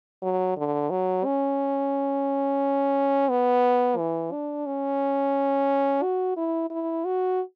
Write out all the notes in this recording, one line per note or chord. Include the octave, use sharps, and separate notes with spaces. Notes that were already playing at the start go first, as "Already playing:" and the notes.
F#3
D3
F#3
C#4
B3
E3
D4
C#4
F#4
E4
E4
F#4